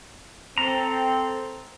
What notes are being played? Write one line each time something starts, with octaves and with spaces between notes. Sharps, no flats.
C4 A4 A#5